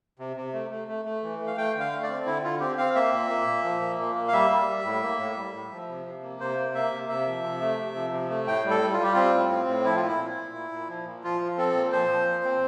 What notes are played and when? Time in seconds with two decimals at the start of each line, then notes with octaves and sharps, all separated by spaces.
0.19 C3
0.37 C3
0.53 A3
0.71 A3
0.88 A3
1.05 A3
1.23 E3
1.40 A3
1.47 F5
1.57 A3 G5
1.74 D3
1.80 F5
1.91 A3
2.03 D5
2.09 C4
2.26 D3 E4
2.43 D3 F4
2.60 C4 G4
2.78 C4 F5
2.95 A#3 E5
3.12 A#2
3.30 A#3
3.47 A#2
3.64 F3
3.81 A#3
3.99 A#2
4.15 A#3
4.28 F5
4.33 G3 E5
4.50 G3
4.68 G3
4.85 A2
5.02 A#3
5.19 A2
5.37 G3
5.53 A2
5.71 F3
5.89 C3
6.06 C3
6.22 A#3
6.40 C3 C5
6.57 A#3
6.75 A#3 E5
6.92 C3
7.09 C3 E5
7.27 F3
7.44 C3
7.61 A3
7.78 C3
7.96 F3
8.13 C3
8.30 A3
8.47 A2 G5
8.64 G3
8.70 A4
8.81 G3
8.93 F4
8.99 G3 G4
9.13 C4 F4
9.34 A2
9.51 C4
9.68 A2
9.85 F3 E4
9.96 F4
10.02 A#2 E4
10.20 A#2
10.37 A#2
10.54 A#2
10.72 A#2
10.89 F3
11.06 A#2
11.24 F3 F4
11.40 F3
11.58 C4 A4
11.75 A#2
11.92 F3 C5
12.10 F3
12.27 A#2
12.44 C4